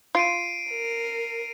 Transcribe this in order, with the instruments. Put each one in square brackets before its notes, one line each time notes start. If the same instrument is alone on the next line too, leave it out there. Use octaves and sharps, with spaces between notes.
[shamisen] F4 [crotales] C7 D7 D#7
[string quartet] A#4